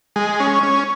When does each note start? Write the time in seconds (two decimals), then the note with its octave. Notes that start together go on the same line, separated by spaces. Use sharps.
0.16 G#3
0.40 C#4
0.63 C#4